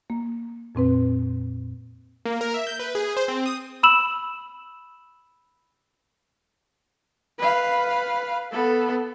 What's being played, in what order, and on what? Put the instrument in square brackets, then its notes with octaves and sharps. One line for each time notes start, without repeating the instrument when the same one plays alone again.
[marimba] A#3
F2 A#2 C4 B4
[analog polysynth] A#3
A#4
E5
G6
B4
G#4
C5
C4
D#6
[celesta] B5 E6 E7 F#7
[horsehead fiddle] B4 F5
B3 A4